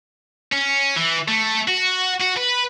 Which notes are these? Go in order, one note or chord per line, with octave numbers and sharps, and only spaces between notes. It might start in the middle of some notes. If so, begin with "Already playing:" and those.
C#4
E3
A3
F#4
F#4
B4